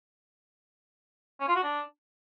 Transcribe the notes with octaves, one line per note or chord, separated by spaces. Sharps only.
C#4
F4
F#4
D4